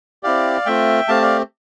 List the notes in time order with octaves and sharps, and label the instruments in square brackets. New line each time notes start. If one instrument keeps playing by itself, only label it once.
[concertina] C4 E4 G4 D5 F5
A3 C4 F4 E5 G5
A3 C4 G4 F5 A5
D5 F5